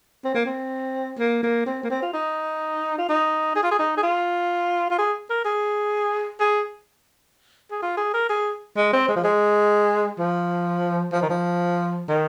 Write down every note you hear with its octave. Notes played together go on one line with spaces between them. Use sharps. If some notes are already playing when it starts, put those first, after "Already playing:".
C4
A#3
C4
A#3
A#3
C4
A#3
C4
F4
D#4
F4
D#4
G#4
F4
G#4
D#4
G#4
F4
F4
G#4
A#4
G#4
G#4
G#4
F4
G#4
A#4
G#4
G#3
C4
G#3
F3
G#3
F3
F3
D#3
F3
D#3